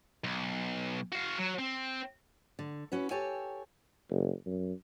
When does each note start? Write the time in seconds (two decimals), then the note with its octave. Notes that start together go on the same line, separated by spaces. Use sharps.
0.24 B1
1.12 F#4 F5
1.38 F#3
1.59 C4
2.59 D3
2.92 C#4 E4 F#4 B4
3.11 G4 A4 C#5 G5 G#5
4.10 F#1
4.46 F#2